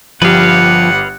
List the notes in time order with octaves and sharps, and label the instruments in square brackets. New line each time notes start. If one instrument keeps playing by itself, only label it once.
[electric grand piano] G1 G4 [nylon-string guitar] F3 [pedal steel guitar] B4 F5 [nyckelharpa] F#5